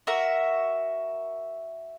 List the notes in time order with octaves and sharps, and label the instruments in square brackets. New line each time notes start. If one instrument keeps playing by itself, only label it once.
[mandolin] F#4 A#4 E5